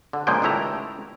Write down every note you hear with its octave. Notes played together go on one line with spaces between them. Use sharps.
D3
A#2 C#3 F3 G#3 A#3 G5
C#2 D#3 A3 E4 G4 A#5